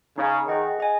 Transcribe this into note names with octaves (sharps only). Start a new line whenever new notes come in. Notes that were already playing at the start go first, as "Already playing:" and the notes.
C#3 D#4 G#4 C#5
D#3 G#4 D#5 F#5
G#4 D#5 G#5